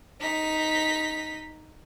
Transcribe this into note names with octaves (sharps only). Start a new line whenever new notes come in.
D#4 B6